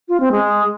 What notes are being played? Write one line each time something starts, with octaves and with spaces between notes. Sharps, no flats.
F4
C4
G#3